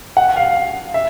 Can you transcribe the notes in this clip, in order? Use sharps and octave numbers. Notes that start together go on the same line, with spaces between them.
F#5
F5
E5